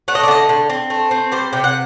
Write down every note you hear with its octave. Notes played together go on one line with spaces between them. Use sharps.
A3 F#5
D#5
D5
D3 D#5
D3
C4
A3
C4
G3 C5
C3 G5
F#5